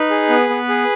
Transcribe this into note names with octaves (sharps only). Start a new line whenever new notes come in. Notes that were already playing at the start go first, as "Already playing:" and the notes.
Already playing: D#4 B4
G#4
B3
B3
G#4